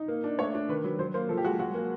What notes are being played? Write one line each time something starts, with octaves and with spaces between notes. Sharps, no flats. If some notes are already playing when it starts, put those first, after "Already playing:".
Already playing: D#4
A#3
D4
A3 C#5
D4
D#3 B4
F#3 B4
F#3 C5
A#3 C5
F3 A4
G4
G#3 F#4
F#3 F#4
A#3